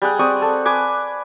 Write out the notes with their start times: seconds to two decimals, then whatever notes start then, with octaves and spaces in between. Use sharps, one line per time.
0.02 G3 G#4 F#5
0.19 C4 D5 C#6 D#6
0.42 A4
0.65 B4 G#5 D6